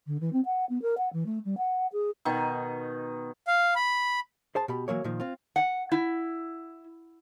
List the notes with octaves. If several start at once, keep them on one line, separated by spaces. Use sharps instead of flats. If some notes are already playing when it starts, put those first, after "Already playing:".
D3
E3
C4
F#5
B3
A#4
F#5
E3
A3
G3
F#5
G#4
B2 D#3 D#4
F5
B5
G#4 C5 A5
B2 G4 B5
E3 F#3 A#3 C#5
A#2 D#3 F3
C4 F4
F#5
E4